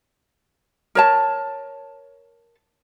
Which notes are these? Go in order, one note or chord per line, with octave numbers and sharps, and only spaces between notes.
A#4 C#5 A5